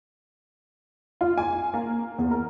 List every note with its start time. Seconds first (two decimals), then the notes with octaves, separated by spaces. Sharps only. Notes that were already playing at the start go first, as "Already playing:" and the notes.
1.21 F4
1.38 G#5
1.74 A#3
2.18 E2
2.31 A#4